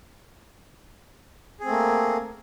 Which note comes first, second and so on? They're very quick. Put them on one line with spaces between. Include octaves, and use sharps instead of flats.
G#4 C4 A3 A#3